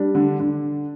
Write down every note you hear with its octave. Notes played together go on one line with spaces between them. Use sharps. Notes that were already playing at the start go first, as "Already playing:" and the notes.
Already playing: G3 D4
D3
D3